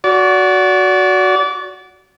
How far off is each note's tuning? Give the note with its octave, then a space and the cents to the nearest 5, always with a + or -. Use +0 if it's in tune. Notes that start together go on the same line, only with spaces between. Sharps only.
F#4 +0 D5 -25